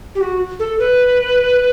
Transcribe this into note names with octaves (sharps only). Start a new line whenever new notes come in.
G4
F#4
A4
B4